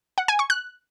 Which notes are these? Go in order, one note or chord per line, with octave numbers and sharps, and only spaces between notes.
F#5
G#5
C#6
F#6